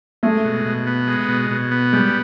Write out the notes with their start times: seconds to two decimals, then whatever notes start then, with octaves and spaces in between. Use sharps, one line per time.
0.23 G#3 A3
0.45 B2
0.66 B2
0.87 B3
1.07 G#3
1.28 B2
1.51 B2
1.71 B3
1.93 G3 G#3